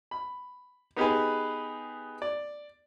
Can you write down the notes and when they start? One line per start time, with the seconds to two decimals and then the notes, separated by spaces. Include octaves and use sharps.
0.11 B5
0.97 B3 D#4 G4 G#4 B4
2.22 D5